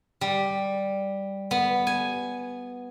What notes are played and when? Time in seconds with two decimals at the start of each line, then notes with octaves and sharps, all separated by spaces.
0.21 G3
1.51 B3
1.87 G#5